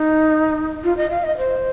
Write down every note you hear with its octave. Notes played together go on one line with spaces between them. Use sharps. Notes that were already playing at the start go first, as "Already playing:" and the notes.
Already playing: D#4
F4
D#5
F5
D#5
C5